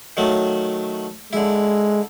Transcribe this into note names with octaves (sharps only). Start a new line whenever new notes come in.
D#3 F#3 A3
D3 G#3 E4